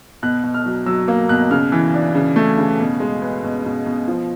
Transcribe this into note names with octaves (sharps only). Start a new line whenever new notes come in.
B2 F#6
B2
F6
F#3
F#3 E6
A#3
B2 F#6
C#3 F6
E3
D4
C#3
A3
C#3
B2
G#3
B3
B2
B2
B2
F3